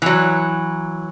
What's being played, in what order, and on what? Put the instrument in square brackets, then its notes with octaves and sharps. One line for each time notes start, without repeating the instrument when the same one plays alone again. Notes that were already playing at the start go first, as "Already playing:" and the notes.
[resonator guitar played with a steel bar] E3 F#3